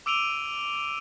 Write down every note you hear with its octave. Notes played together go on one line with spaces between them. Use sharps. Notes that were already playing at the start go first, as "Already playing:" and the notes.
D6 E6 D7 D#7 F7 G7